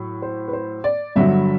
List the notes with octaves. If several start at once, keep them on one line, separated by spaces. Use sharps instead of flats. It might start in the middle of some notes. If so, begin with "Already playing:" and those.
Already playing: A2 F#3
C5
B4
C5
D5
G1 G2 D3 F#3 E5